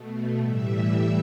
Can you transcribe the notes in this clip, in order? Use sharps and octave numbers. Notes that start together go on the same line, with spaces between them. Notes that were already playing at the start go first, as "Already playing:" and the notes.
Already playing: B2 A3
A2 E3 G3 E5